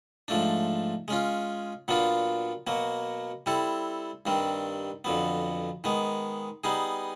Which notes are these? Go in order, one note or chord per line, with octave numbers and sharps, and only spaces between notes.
G#2 F3 A3 D4
G#3 C#4 F4
A#2 F#3 B3 D4 F4
B2 F#3 A#3
G3 C4 E4 A4
G2 D#3 G3 C4
F2 D3 F#3 B3
D#3 G#3 B3
G3 B3 D#4 G#4